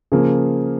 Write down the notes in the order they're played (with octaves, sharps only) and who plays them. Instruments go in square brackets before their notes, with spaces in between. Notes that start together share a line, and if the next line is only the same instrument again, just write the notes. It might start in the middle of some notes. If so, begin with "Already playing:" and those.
[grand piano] C#3 F3 A#3 G#4